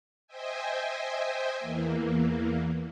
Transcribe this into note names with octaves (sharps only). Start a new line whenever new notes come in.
C5 D#5 E5 G5 G#5
E2 E3 A#3